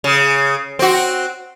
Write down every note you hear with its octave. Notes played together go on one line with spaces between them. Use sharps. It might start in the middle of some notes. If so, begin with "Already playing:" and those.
C#3
C4 F#4